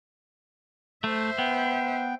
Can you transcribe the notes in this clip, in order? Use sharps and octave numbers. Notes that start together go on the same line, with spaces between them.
A3 C5 E5
B3 G5